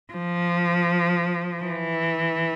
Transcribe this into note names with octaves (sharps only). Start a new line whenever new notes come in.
F3
E3